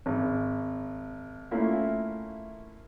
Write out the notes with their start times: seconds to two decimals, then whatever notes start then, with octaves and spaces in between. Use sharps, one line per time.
0.06 G#1
1.51 A3 A#3 C#4 E4 F4